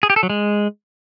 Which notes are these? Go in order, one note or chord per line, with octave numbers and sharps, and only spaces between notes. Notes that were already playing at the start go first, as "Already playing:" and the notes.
G#4
G4
A4
F#3
G#3